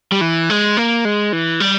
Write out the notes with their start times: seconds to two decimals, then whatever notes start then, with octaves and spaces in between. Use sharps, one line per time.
0.12 G3
0.21 E3
0.50 G#3
0.77 A#3
1.05 G#3
1.33 E3
1.60 G3